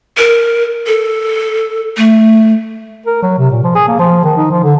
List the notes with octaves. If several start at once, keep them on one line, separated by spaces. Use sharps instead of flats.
A#4
A4
A3
A#4
F#3
C3
A#2
F3
G#4
A#3
F3
D#3
D#4
F3
D3